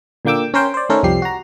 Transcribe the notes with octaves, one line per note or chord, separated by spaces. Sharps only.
A#2 D3 A#3 G5 D6 E6
C#4 A#4 C5 G5
C5 D5
D#3 A3 C#4 A4 A#4 C5
C2 F2 F3 G3 G4 C7
F#4 A#5